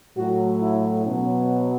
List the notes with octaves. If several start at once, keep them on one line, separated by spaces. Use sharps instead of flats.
A2 F#3 F#4
E4
B2 F#3 C#4